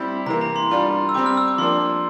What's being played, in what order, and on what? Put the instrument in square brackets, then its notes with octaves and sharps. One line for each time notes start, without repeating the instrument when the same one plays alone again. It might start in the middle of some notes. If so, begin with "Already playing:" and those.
Already playing: [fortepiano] G3 C4 E4 G4
[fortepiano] C3 E3 A#3 [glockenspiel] A#5
[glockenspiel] A#5
C6
[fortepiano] G3 D4 F4
[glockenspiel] E6
[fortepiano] G3 C4 G4 [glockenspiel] D6
[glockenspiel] F6
E6
D6
[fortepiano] F3 A#3 D4 [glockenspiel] C6